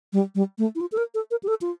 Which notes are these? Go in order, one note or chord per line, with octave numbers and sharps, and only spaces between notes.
G3
G3
A3
E4
F4
A4
A#4
A4
A#4
G4
A4
F4